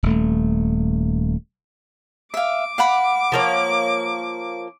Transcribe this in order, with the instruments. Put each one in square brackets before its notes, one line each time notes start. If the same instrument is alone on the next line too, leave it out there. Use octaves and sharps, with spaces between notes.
[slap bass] D#1 A3
[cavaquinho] E5 F5 [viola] D6
[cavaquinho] F5 F#5 B5
[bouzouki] F3 A#3 C#5